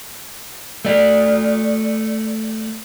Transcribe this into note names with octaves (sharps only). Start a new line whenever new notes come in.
A3 D5